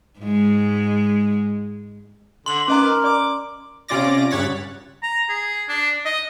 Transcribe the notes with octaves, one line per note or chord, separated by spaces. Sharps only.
G#2 G#3
D3 C6 F#7
D#3 C#4 B4 D#5 A#5 D6
A#4
D5 D6
C3 C#4 F4 D5 D6 A#6
G2 C#3 C#5 F#5 A6 B6
A#5
G#4
D4
D#5